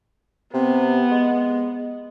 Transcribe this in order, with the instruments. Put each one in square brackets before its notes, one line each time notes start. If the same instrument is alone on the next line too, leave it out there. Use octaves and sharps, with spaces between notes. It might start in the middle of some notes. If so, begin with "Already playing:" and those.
[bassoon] C3 [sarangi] B3
[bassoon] G#3